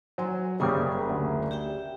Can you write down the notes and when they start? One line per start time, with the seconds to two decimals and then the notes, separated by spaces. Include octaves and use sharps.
0.18 F#3 C5 G#5
0.60 F#1 C#3 G3 G4 G#4 A#4 G#5 A#5
1.09 D2
1.51 G4 E5 G5